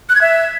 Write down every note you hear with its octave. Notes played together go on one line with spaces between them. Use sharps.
F#6
G#6
E5